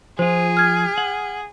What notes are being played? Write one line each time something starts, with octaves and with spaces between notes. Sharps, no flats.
F3 F4 G#4 C5
F6 G#6
F#5